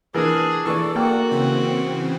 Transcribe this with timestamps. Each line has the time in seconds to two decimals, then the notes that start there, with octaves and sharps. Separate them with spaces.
0.15 E3 D4 G#4 A#4
0.65 E3 A4 D5 C#6
0.96 A#3 F#4 G5
1.31 C#3 E3 C4